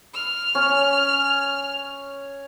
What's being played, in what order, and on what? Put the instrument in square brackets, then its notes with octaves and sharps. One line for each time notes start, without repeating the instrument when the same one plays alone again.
[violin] F6
[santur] C#4